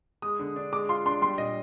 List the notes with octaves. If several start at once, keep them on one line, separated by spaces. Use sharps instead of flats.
G#3 D#6
D3
D4
G#3 D6
F4 C6
D4 C6
G3 C6
A#2 D#5